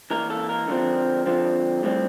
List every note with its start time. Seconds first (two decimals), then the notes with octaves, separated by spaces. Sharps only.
0.10 E3 A#3 A#4
0.30 A4
0.49 A#4
0.68 D3 F3 C4
1.26 D3 F3 C4
1.83 A2 G3 C4